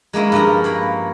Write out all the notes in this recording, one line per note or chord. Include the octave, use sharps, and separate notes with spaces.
G#3 A#3 C#4 E4
G2 F3 A#4 A#5
A#3 C#5 B5